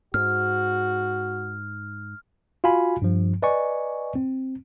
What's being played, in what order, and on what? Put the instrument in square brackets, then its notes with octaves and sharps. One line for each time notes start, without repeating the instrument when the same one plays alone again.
[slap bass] G#2 [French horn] F#4 [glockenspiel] F6
[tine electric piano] F4 F#4 F5 G#5 B5
G2 F3
B4 D5 D#5 G#5 C#6
C4